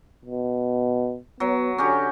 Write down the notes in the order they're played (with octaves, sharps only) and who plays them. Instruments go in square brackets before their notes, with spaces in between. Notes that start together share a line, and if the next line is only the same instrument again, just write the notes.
[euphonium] B2
[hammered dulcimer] F#3 [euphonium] B3
[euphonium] D3 [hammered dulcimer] C#4 F#4 G4